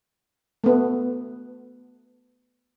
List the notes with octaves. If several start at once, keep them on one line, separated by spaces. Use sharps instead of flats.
A3 B3